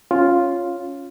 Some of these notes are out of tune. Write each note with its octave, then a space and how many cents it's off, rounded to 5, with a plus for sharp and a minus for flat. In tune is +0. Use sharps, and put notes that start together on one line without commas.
C#4 +0 F4 +0